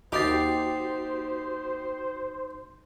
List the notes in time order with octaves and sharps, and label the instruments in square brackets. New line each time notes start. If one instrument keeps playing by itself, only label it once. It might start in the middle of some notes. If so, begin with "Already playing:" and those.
[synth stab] D#2 G4 C7 [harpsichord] D#4 [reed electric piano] F#4 A6 [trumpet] C5